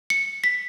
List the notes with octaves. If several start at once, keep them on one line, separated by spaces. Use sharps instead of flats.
C#7
B6